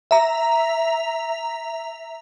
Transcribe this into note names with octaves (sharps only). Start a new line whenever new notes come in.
E5 A#5